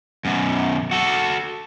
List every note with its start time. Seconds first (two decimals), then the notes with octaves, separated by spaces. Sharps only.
0.25 F#2 B2
0.91 F#4 A4